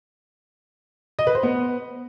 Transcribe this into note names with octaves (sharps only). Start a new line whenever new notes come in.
D#5
B4
C5
B3